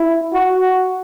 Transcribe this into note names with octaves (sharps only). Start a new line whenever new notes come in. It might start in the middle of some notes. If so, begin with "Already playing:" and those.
Already playing: E4
F#4